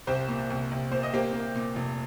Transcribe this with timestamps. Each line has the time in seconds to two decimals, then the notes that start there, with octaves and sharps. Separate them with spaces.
0.07 C2 G4 C5
0.28 A#2
0.50 C2
0.71 C2
0.91 A#2 C5
1.03 D#5
1.13 A#3 G4 C5
1.33 A#3
1.55 A#2
1.76 F1